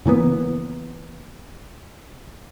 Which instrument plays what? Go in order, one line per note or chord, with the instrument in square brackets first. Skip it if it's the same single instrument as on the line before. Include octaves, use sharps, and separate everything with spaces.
[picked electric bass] C#3 E3 A#3 B3